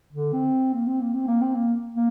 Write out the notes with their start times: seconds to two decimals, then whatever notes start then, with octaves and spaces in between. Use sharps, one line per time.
0.13 D3
0.33 C4
0.74 A#3
0.87 C4
1.00 A#3
1.14 C4
1.27 A#3
1.41 C4
1.55 A#3
1.95 A#3